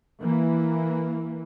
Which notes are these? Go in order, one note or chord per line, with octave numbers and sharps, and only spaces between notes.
E3 A#3